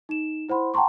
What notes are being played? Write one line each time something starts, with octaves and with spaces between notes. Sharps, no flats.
D#4 E7
E4 C5 F#5 B5 C6
F#5 G5 A5 A#5 C6 C#6